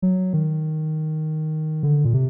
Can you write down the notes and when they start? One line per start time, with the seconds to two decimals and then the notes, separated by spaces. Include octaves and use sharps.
0.02 F#3
0.33 D#3
1.83 D3
2.05 A#2
2.14 C3